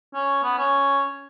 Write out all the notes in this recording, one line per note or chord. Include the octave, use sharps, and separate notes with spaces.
C#4
B3
C#4